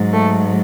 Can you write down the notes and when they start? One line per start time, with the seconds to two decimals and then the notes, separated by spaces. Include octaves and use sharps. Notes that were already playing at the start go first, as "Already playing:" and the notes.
Already playing: G#2 F#3
0.13 A3